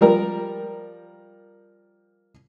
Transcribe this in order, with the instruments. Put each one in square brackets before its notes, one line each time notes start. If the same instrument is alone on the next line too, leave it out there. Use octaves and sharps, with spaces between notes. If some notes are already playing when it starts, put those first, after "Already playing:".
[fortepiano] F3 G3 A#4